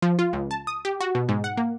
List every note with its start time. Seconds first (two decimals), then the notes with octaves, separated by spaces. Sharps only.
0.02 F3
0.19 F4
0.33 C#2
0.51 A5
0.67 D#6
0.85 G4
1.01 F#4
1.15 B2
1.29 G#2
1.44 F#5
1.57 A#3